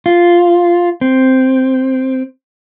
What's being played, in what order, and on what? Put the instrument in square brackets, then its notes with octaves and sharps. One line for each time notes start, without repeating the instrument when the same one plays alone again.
[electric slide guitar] F4
C4